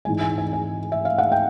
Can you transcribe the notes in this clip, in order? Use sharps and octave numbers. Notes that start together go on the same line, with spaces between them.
G#2 E3 G#3 G#5
G#5
G#5
G#5
E5
F5
F#5
G5